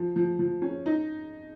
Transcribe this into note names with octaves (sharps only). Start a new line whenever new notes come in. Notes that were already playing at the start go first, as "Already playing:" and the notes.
Already playing: F3
F3
F3
C#4
D#4